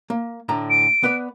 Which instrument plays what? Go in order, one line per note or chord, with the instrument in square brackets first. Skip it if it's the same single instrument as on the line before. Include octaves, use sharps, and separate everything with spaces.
[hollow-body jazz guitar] A#3
A2 D3 A#5
[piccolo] D7
[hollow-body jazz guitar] B3 B4 D5